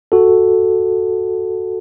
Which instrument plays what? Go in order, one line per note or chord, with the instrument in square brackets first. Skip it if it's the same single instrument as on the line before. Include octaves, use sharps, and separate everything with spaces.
[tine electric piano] F#4 A4